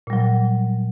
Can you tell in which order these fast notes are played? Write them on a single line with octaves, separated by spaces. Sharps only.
A#2 G3 F#3